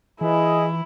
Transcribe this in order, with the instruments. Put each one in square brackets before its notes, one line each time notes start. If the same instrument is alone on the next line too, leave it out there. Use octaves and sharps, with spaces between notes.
[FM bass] E3 [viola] E4 [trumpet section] G#4 D#5